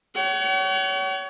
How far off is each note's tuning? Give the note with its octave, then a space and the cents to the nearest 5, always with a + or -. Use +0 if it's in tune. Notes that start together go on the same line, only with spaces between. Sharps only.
C#5 +30 F#5 +45